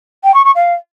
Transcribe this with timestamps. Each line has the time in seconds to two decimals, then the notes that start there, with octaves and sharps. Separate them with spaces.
0.24 G5
0.34 C#6
0.45 C#6
0.55 F5